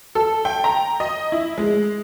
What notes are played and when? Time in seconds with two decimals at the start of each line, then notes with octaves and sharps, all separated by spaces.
0.15 A4
0.45 G5
0.64 A#5
1.00 D#5
1.32 E4
1.58 G#3